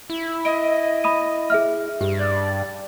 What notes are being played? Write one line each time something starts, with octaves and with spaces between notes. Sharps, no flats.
E4
D#5 D7
B5 D#6 D#7
G#4 E5 F6
G2 G4
D5